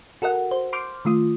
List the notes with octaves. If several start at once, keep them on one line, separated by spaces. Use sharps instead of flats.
F#4 A4 A#4 D#5 F#5
C5
C6 D6 F6 G6
D#3 A3 F4 D#6